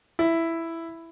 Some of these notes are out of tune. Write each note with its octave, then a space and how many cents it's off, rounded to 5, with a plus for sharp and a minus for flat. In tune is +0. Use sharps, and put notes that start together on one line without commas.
E4 +5